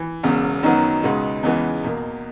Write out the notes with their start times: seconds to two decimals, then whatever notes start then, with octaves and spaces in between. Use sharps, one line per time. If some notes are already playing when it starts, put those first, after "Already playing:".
Already playing: E3
0.23 E1 E2 C#3
0.63 F#2 D#3 F#3 B3 D#4
1.03 C#2 B2 G#3 B3 D#4
1.43 E2 C#3 E3 G#3 B3
1.83 E2 B2 A#3